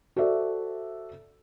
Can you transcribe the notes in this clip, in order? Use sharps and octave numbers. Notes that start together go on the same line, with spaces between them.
F#4 A4 C5 D5 E5